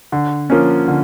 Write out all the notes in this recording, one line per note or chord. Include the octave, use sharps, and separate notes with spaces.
D3
F3 A#3 C#4
D3